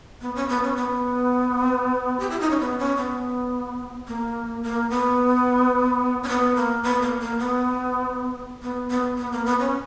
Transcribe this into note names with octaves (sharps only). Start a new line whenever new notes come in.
B3
C#4
B3
C#4
B3
G4
E4
D#4
C#4
B3
C#4
B3
A#3
A#3
B3
C#4
B3
A#3
B3
A#3
A#3
B3
B3
B3
B3
A#3
B3
C#4